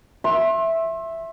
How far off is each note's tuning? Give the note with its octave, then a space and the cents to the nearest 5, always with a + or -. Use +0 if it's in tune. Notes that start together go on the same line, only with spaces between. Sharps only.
E5 +0 C6 +35